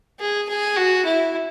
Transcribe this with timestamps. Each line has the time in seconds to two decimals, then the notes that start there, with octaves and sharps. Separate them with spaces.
0.20 G#4
0.49 G#4
0.77 F#4
1.05 E4